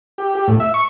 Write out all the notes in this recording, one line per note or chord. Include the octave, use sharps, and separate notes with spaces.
G4
G4
A2
E5
C#6